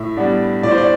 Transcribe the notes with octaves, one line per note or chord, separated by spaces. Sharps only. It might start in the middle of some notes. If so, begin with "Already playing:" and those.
Already playing: A2 E5
G3 B3 D4
A2 D5
C5
D5